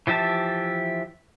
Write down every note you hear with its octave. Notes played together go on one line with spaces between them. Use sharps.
E3 F3 G4 E5 A5